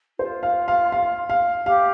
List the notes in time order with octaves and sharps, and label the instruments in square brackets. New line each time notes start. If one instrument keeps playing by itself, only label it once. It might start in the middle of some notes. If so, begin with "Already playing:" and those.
[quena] F4 [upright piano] C5
[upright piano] F5
F5
F5
F5
[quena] G4 [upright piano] F5